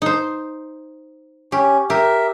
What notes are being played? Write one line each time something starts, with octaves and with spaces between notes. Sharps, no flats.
D#4 C5
C#4 G4
G4 A#4 E5